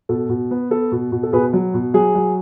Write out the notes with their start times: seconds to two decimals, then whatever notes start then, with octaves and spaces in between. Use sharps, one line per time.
0.09 B2 A4
0.29 B2
0.51 B3
0.70 B3 A4
0.92 B2
1.12 B2
1.23 A4
1.33 B2 G#4 B4
1.53 F#3
1.74 B2
1.94 F#3 G#4
2.15 F#3